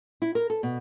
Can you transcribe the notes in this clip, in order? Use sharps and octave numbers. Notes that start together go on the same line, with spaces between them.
E4
A#4
A4
B2